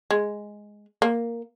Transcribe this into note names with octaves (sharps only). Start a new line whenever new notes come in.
G#3
A#3